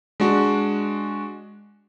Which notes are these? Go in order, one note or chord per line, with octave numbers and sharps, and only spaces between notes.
G#3 D4 F#4